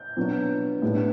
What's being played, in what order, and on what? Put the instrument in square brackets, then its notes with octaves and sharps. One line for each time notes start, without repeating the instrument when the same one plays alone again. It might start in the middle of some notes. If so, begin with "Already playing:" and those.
Already playing: [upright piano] G6
B2 F#3 B3 D4
A2 G3 B3 D4